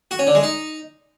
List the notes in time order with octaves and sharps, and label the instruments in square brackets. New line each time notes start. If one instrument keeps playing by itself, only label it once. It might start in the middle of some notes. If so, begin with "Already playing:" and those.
[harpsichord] F#4
C#4
D3
G#3
D#4